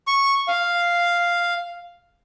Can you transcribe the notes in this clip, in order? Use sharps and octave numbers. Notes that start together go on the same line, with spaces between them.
C#6
F5